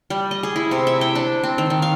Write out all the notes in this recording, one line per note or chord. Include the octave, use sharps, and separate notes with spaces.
G3
D#5
G#4
E4
C3
E5
G5
D4
C4
D#3
D#3
F5